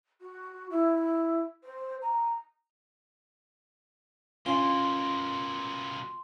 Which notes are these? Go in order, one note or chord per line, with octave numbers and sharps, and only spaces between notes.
F#4
E4
C5
A#5
B2 A#3 C#4 F4 C6 G7